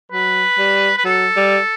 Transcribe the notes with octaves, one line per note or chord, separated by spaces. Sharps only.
F#3 B4
G3
B4
F#3 A4
G3